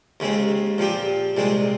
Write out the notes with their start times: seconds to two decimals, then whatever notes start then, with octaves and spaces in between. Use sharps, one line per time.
0.20 D#2 C#3 G#3 C4
0.78 A#2 F3 C4 G4
1.37 C2 A#2 G#3 C4